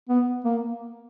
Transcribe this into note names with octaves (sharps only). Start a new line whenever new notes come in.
B3
A#3